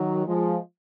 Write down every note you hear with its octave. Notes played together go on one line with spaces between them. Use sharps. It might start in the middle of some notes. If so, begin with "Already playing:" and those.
Already playing: D#3 F#3
F3 G#3